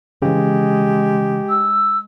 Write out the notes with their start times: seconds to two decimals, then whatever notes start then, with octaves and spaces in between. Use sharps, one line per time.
0.22 C#3 E3 G#3 G4
1.49 E6